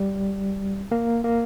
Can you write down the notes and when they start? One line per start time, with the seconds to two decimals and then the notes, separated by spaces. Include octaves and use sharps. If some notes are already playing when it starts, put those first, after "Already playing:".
Already playing: G3
0.92 A#3
1.24 A#3